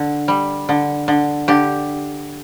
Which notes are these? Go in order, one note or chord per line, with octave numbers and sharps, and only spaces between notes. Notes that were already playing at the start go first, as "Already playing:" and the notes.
Already playing: D3
G3
D3
D3
D3 G4